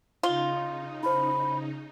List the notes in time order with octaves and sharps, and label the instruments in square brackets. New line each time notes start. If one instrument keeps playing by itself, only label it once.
[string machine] C#3 D#4 [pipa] F4 [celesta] C6 G7
[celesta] E4 C5 [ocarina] B5